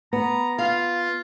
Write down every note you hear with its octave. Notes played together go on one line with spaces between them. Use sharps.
B3 A#5
F4 F5